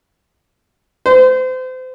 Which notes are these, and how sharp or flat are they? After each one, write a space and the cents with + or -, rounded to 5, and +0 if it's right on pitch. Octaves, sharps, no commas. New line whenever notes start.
C5 -30